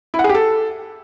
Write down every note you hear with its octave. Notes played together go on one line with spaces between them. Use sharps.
E4
F#5
G#4
G4
A4